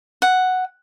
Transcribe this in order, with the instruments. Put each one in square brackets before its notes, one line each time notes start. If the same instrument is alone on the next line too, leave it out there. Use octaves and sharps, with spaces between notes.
[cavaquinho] F#5